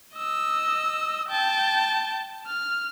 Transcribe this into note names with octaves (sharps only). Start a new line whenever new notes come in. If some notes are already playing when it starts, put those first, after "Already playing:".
D#5 E6
G5 A5
F6